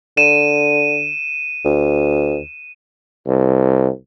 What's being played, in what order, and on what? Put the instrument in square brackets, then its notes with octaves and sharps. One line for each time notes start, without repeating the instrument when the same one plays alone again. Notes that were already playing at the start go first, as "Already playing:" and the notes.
[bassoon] D3 [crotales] D#7 E7
[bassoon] D2
[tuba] C2